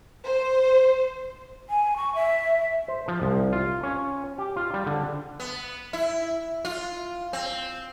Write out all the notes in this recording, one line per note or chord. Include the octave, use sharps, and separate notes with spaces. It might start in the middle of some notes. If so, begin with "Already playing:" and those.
C5
G#5
C#6
E5
C5
F3
C2
F4
C#4
G4
F4
G3
D3
B3
E4
F4
C4